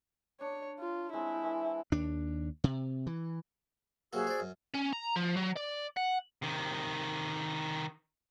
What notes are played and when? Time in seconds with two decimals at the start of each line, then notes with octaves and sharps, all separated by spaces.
0.41 D4 C#5
0.79 F4
1.13 G#3 C4 E4
1.44 E3
1.92 D#2 D4
2.64 C3
3.07 E3
4.13 C3 F#3 A#3 F#4 G#4 E6
4.27 C5 D5
4.40 F#2
4.74 C#4
4.93 A#5
5.16 F3
5.37 F#3
5.57 D5
5.97 F#5
6.42 C3 D#3